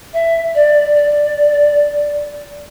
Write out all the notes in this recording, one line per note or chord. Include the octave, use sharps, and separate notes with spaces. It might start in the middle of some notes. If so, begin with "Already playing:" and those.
E5
D5
D5